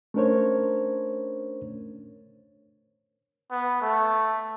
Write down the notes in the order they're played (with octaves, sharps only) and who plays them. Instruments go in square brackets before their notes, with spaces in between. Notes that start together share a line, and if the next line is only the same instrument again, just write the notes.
[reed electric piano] A3 C#4 D4 A#4 C5 C#5
[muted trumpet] B3
A3